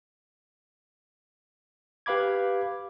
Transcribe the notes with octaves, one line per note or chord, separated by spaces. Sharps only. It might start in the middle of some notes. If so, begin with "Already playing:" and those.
G4 B4 F5 B5 D6 G#6